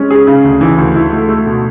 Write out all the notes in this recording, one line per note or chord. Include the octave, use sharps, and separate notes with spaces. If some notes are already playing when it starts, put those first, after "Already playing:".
Already playing: G#3 C#4
G#4
C#3
D2
E3
D2
E4
A3
A3
B2